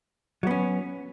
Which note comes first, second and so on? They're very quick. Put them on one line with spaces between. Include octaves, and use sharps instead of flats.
F#3 B3 C#4